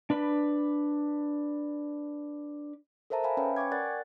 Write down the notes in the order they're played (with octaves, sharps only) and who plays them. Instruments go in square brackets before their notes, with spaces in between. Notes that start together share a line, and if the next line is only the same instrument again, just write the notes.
[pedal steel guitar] D4 B4 B5
[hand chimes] A4 A#4 C5 E5 A5 A#5
E5 F5 G#5 B5
C#4 B4 C#5 G5 B5
G5 G#5 C#6 D6 G#6
A#4 D5 F#5 F#6 A6